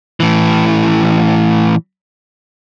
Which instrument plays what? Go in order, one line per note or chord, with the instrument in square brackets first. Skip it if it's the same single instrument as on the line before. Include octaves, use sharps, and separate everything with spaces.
[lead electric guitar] A2 E3